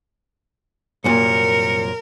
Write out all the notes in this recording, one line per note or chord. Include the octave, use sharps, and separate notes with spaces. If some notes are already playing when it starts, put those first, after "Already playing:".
C2 F#2 A#2 A#4 C#7